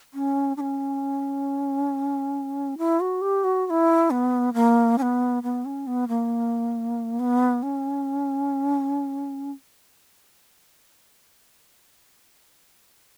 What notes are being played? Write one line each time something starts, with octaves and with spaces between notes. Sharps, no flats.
C#4
D4
C#4
E4
F#4
G4
F#4
F#4
E4
B3
A#3
C#4
B3
B3
C#4
B3
A#3
B3
C#4